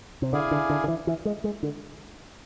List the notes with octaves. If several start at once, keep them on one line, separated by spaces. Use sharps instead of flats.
C3
D3 E4 G#4 D5 F5 G#5
D3
D3
D3
E3
E3
G#3
G#3
D3